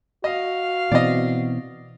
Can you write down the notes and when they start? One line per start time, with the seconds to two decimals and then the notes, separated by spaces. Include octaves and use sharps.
0.24 F#4 D#5 F5
0.92 B2 E3 C4 D5 D#5